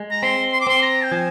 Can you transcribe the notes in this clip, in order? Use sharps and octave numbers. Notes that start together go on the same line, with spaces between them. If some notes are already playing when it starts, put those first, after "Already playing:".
Already playing: G#3
A#5
C4 C6
C6
D6
C4 C6
A#5
G5
F3 G#5